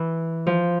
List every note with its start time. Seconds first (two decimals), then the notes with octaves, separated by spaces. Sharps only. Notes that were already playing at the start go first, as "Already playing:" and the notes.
Already playing: E3
0.47 F3